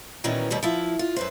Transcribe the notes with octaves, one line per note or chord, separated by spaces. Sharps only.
A#2 D#3 E3 F#3 B3 C#4
D#2 B2 G3 B4
F3 E4
F4
F#2 B4 C5